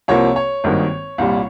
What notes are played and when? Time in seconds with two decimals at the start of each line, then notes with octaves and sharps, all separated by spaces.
0.08 C2 C3 F3 A#3 C#5
0.36 C#5
0.64 G#1 G2 D#3 A#3
1.18 C2 A#2 G3